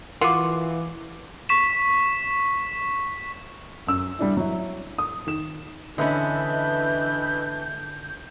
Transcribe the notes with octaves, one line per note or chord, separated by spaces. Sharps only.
E3 F4 F#4 A#4 D6
C#6 B6 E7
F#2 E6
G3 D4 E4
F#3 E4
D#6
D#3 E7
D3 E3 C#4 D4 D#5 E5 B5 G6